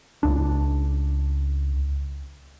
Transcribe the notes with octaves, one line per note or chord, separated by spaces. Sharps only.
C#2 D4